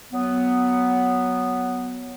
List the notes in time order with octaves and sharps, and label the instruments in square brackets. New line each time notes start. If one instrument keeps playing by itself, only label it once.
[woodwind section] F#3 B3